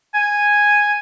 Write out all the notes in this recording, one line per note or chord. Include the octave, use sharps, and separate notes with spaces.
G#5